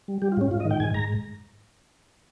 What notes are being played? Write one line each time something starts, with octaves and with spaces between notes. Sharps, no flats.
G3
G3 G4
F4
G#2 C#4
G#2 F4
D#5
D#3
G5
G#2 G#5
G#2 A#5